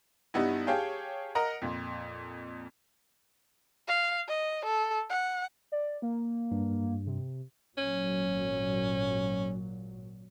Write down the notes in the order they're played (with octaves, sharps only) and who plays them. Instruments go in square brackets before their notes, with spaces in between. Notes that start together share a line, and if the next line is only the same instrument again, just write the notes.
[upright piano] G2 G3 B3 D#4 E4
G4 G#4 C#5 F5 G5 A5
A#4 D#5 F#5 A#5
F2 A#2
[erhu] F5
D#5
A4
F#5
[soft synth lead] D5
A#3
[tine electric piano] G2
[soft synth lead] C3
[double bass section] G#1 A#2 F#3 [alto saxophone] C#4